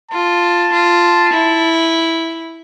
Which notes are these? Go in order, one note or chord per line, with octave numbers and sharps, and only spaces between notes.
F4 A5
F4
E4